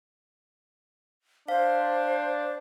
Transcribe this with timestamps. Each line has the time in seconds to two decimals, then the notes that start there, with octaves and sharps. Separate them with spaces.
1.48 D4 C5 F5